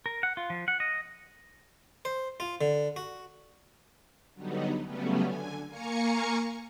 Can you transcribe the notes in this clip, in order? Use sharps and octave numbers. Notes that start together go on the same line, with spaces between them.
A#4
F#5
F4
F3
F#5
D#5
C5
F4
D3
F#4
D3 F#3 G3 B3 D#4
C#3 F#3 G3 A3 B3 C#4
D3 G#5
A#3 F5 G#5 A#5 C#6 C#7